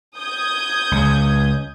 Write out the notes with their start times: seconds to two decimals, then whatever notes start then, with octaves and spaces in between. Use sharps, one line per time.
0.18 D#6 G6 G#6
0.91 C#2